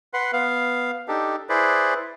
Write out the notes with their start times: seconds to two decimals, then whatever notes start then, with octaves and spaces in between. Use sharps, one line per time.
0.14 B4 F#5 C6
0.33 B3 F5
1.08 D4 D#4 G4 A4
1.49 E4 G#4 B4 C5 D5